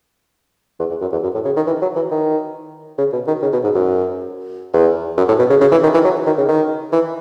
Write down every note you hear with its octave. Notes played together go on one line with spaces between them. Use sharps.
E2
E2
F#2
E2
F#2
A2
C#3
D#3
E3
F#3
E3
D#3
C#3
B2
D#3
C#3
B2
G#2
F#2
E2
F#2
A2
B2
C#3
C#3
E3
D#3
E3
F#3
D#3
C#3
D#3
E3